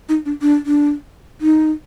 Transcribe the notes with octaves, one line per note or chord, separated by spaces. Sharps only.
D#4
D4
D4
D4
D#4